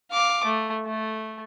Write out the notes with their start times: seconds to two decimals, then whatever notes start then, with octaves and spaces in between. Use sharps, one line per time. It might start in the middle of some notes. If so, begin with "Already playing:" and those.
0.12 F5 D6
0.45 A3
0.87 A3